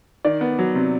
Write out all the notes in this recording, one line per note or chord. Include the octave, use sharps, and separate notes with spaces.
D#3 D5
B3
F#3
C3